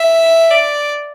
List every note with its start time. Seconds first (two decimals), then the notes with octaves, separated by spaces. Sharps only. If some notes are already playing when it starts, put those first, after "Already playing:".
Already playing: E5
0.51 D5